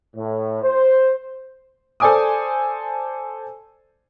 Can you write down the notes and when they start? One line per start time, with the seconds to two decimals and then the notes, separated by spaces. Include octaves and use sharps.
0.16 A2
0.63 C5
2.00 A4 C5 D5 G#5 D6 D#6